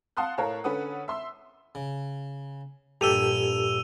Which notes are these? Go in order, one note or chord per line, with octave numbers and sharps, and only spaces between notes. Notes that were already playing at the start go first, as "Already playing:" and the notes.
F5 F#5 A5 C6 D#6 F#6
A2 A#4 C#5 F5 A5 A#5
D3 C#4 A4 B4 F#5 D#6
E5 C6 E6
C#3
A#1 G2 G4 A4 E6 D#7 F7